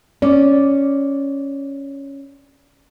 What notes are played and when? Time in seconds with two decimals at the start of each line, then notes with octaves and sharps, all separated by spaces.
0.22 C#4 D5